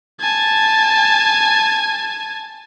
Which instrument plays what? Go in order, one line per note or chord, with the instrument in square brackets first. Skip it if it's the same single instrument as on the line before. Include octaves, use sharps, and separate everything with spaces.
[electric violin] G#5 A5